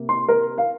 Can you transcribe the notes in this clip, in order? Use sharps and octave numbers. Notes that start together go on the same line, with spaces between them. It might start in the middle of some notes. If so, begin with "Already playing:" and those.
Already playing: C3 A#3
C6
A#4
F5